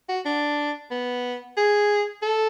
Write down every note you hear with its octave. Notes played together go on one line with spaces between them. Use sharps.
F#4
D4
B3
G#4
A4